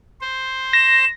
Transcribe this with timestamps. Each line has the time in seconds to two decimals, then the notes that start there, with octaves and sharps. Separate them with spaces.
0.21 C5
0.73 A#6 E7